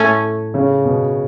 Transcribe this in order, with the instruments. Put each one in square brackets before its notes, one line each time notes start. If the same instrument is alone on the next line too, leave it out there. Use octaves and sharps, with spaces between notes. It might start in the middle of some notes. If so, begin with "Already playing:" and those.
Already playing: [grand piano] A2 [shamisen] A3 C#4
[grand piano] C#3
B2